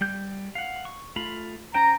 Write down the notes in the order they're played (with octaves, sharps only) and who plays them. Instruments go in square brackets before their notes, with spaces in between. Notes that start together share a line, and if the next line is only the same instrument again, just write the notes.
[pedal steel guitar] G3 G6
F5 F#5
C#6
A3 F4 B5
[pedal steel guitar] C#4 C5 G5 [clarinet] A#5